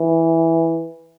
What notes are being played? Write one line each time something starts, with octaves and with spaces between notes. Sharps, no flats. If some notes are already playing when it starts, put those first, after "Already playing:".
Already playing: E3